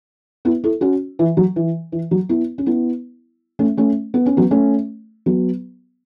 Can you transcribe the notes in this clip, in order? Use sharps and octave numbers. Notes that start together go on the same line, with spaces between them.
B3 E4
E4 A4
C#4 F#4
E3
F#3
E3
E3
F#3
B3 E4
C#4
B3 E4
A3 C#4
A3 C#4
B3
C#4
F#3 B3
A3 C#4
F#3 B3